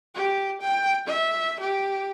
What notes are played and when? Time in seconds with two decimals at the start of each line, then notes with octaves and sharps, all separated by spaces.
0.15 G4
0.61 G5
1.07 E5
1.60 G4